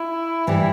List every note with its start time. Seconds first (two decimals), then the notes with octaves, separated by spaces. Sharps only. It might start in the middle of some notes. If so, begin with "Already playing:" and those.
Already playing: E4
0.47 G2 E3 G3